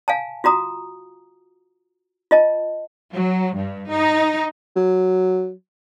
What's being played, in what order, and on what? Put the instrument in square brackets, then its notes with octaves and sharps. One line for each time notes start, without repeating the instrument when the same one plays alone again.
[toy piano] F5 G#5 A5
F4 F#4 A#5 D#6
F4 D#5 A5
[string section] F#3
G2
D#4
[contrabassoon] F#3